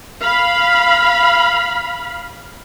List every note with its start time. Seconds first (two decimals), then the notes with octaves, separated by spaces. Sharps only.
0.20 F5 B5